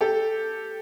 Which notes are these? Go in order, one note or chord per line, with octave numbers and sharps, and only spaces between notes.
G4 A4